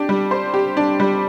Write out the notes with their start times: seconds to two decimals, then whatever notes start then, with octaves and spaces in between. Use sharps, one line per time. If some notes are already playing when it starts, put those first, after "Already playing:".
Already playing: D4 G4
0.09 G3
0.31 C5
0.54 G4
0.77 D4
1.00 G3